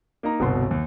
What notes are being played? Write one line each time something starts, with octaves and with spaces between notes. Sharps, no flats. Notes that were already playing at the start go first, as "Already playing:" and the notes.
A#3 D#4 A#5
G1 C2 B2 F#4 C6
D#2